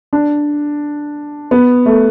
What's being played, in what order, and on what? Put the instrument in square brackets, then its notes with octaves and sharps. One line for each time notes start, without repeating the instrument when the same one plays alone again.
[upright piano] D4
B3
A3